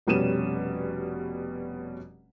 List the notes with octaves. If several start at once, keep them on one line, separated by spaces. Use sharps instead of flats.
F1 B2 G3 C#4 D#7 E7